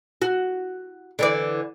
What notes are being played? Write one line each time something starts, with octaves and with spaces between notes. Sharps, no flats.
F#4
D3 E3 D5